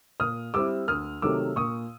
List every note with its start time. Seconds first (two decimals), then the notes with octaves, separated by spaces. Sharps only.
0.20 A#2 D#6 F6
0.54 G3 C4 E4 D6 E6
0.88 D2 D#6 F6
1.22 C3 D#3 F#3 A3 D6 E6
1.56 A#2 C#6 D#6